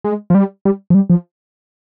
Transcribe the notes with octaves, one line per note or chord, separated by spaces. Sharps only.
G#3
F3
G3
G3
F3
G3
F3